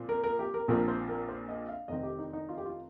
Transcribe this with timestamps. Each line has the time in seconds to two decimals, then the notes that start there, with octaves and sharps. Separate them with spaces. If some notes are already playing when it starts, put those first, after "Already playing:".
Already playing: A#2 F3 C4
0.09 A#4
0.24 A#4
0.39 G4
0.54 A#4
0.68 A#1 A#2 F3 C4 A#4
0.88 C5
1.09 A#4
1.29 C5
1.48 D#5
1.69 F5
1.88 F1 F2 D#3 C4 D#5
2.03 G4
2.19 D#4
2.33 D#4
2.49 F4
2.57 G4
2.66 F4